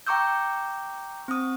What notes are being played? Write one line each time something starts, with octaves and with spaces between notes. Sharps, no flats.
G5 A#5 C#6 D6 E6 G6
C4 D#6